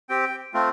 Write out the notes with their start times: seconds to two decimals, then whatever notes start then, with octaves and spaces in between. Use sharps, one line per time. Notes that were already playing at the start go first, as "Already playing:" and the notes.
0.09 C4 G4 G5
0.54 A3 C4 F4